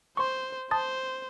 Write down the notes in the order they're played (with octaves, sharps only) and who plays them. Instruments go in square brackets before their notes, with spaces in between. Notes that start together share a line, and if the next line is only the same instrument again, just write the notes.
[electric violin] C5 [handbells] C6 C#6
[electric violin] C5 [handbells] A5 D#6 A6